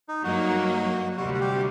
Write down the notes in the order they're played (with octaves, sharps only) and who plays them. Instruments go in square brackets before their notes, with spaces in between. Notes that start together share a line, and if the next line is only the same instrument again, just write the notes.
[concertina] D#4
[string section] G2 F#3 A#3 D#4 [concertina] F#4
[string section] D2 C3 G3 [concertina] F#4
[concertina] F#4
G4